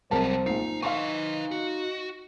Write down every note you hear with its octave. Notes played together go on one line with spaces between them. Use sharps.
C2 F#3 G3 A#4 C5 A5
A#1 D#4 C7
D#4 B4 F5 G#5 C6 C#6
F#4